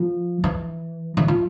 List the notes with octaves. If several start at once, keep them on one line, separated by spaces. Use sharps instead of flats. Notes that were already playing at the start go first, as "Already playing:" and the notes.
Already playing: F3
E3
E3
F3